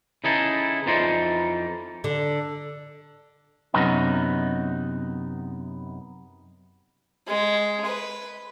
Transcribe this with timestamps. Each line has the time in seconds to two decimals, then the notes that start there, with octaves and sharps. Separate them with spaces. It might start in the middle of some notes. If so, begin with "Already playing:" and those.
0.24 C#3 E3 D#4 E4 G#4 A4
0.86 F2 E3 F3 D#4 D5 C6
2.04 D3
3.74 F#2 C3 B3 D#4
7.27 G#3
7.85 B4